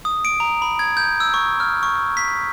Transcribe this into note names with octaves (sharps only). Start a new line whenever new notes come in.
D#6
D7
A#5
B5
G#6
G6
E6
C#6
F6
C#6
B6